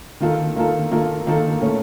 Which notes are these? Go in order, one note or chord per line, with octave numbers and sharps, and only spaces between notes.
D#3 A#3 F4 A4
D#3 A#3 F4 A4
D#3 A#3 F4 A4
D#3 A#3 F4 A4
A#2 A3 C#4